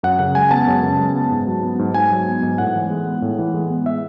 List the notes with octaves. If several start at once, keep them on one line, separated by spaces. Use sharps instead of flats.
F#2 F#5
C#3 F#5
G#3 G#5
B3 A5
F#2
C#3
G#3
B3
G#2
F#3
B3
G#2
G#2 G#5
F#3
B3
G#2
A2 F#5
E3
G#3
B3
A2
E3
G#3
B3
E5